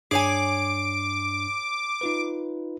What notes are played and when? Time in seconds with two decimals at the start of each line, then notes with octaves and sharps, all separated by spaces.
0.11 G2 D4 G#4 C#5 G#5 D6 C7
2.01 D#4 F4 B4